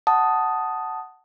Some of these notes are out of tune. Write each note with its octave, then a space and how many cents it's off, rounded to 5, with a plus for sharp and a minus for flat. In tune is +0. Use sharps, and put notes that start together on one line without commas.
F#5 +10 A5 +0 D#6 +0